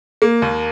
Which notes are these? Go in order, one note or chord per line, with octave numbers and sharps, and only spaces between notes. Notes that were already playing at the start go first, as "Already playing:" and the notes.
A#3
D#2